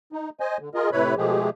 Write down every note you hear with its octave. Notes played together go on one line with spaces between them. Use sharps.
D#4
C5 D#5 G#5
D3
F4 G#4 A#4 D#5
A2 C3 E4 B4 C#5 B5
B2 F3 G#3 A3 G4 G#4